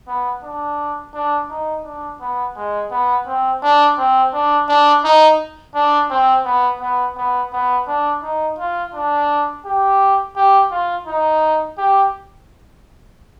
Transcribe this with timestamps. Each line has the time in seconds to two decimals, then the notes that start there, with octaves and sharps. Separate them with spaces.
0.08 B3
0.44 D4
1.14 D4
1.50 D#4
1.84 D4
2.21 B3
2.56 G#3
2.91 B3
3.27 C4
3.62 D4
3.98 C4
4.34 D4
4.69 D4
5.04 D#4
5.75 D4
6.11 C4
6.45 B3
6.81 B3
7.17 B3
7.53 B3
7.88 D4
8.23 D#4
8.59 F4
8.95 D4
9.65 G4
10.36 G4
10.71 F4
11.07 D#4
11.78 G4